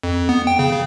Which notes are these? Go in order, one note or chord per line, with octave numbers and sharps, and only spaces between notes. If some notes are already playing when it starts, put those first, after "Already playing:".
F2
B3
G5
C#3
C#3